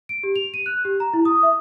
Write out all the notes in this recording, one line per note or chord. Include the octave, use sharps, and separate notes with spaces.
D7
G4
F7
D#7
F#6
G4
A#5
E4
D#6
E5